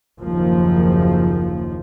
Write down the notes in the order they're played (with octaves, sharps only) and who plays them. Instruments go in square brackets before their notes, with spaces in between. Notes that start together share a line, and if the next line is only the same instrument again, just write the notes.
[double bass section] F#1 D#2 F3